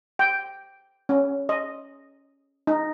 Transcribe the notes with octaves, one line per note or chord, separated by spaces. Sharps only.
G5
C#4
D#5
D#4